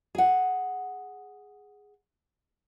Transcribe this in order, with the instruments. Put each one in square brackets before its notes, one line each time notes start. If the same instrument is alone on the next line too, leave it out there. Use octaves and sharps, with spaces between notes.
[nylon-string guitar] G#4 F#5